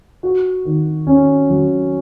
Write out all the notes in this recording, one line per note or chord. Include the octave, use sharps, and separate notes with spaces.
F#4
D#3
C#4
F#3